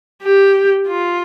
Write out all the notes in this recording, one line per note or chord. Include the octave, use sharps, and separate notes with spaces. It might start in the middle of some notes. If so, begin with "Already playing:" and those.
G4
F4